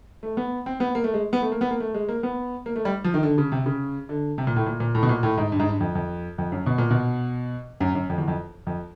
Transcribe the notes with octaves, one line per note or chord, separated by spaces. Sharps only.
A3
B3
C4
B3
A#3
A3
G#3
B3
A3
A#3
B3
A#3
A3
G#3
A#3
B3
A#3
A3
G3
F3
D#3
D3
C#3
C3
C#3
D3
C3
A#2
A2
A#2
A#2
A2
B2
A#2
A2
G#2
G2
G#2
G2
F2
F2
F2
F#2
B2
A#2
B2
F#2
F#2
F2
E2
F2
F2